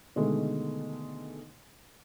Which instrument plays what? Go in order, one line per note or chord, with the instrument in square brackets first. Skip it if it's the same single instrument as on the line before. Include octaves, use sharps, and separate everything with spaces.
[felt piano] B2 D3 D#3 G#3 A3